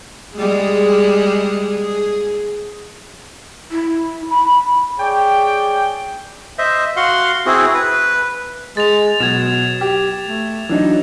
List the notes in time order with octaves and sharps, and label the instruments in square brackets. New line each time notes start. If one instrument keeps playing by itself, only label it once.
[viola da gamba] G3 G#3 G#4
G#4
[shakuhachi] E4
B5
[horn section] G#4 C#5 D5 G5
[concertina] C5 D#5 E5
F#4 F5 F#5 C6
C4 E4 F#4 G#4
B4
[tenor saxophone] G#3 [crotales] A6 F7
[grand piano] B2 [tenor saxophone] F#3 [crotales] G#6 A6 E7
[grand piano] G4
[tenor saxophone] A3
[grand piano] E3 D4 D#4 [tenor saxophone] F#3